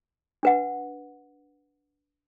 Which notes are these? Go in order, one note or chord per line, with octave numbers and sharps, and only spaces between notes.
D4 B4 F#5